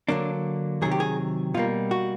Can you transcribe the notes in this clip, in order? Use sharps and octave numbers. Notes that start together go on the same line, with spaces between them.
D3 F#3 A#3 D4
C3 D#3 F#3 G#4
G4
G#4
B2 G3 A#3 F4
F#4